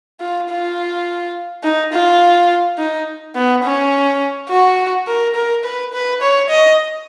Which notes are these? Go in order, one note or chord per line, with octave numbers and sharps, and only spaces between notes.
F4
F4
D#4
F4
D#4
B3
C#4
F#4
A#4
A#4
B4
B4
C#5
D#5